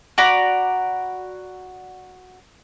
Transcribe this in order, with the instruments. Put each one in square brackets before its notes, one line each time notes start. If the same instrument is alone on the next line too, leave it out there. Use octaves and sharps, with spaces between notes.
[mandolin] F#4 D5 A#5 B5